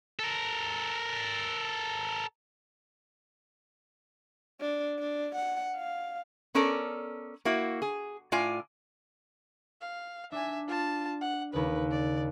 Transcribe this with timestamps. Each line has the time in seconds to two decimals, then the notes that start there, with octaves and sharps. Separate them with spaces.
0.19 A4 A#4
4.61 D4
4.99 D4
5.35 F#5
5.76 F5
6.55 B3 C#4 A4 A#4 D5
7.45 A#3 E4 F#4
7.82 G#4
8.32 A2 F4 D5 G#5
9.81 F5
10.32 D4 E5 G#5
10.67 F4 A5
11.21 F#5
11.53 D#2 C#3 B4
11.91 D5